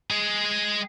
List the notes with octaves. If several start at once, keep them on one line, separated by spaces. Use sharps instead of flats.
G#3 G#4